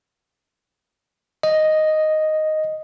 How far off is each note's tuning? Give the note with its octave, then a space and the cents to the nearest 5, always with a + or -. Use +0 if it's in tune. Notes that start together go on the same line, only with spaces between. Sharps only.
D#5 +0